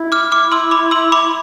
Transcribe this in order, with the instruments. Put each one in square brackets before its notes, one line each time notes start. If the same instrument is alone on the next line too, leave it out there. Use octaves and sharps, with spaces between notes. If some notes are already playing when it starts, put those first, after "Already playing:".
Already playing: [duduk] E4
[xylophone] D6 F6
D6 F6
C6 E6
B5 D6
C6 E6
B5 D6